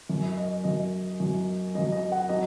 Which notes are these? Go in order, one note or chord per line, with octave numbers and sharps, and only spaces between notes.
F#2 F#3
D#5
F#2 F#3 D#5
F#2 F#3
F#2 F#3 D#5
D#5
F#5
F#3 D#5